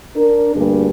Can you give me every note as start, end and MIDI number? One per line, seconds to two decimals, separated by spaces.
0.16 0.53 62
0.16 0.53 70
0.55 0.90 38
0.55 0.90 43
0.55 0.90 55
0.55 0.90 58
0.55 0.90 62
0.55 0.90 68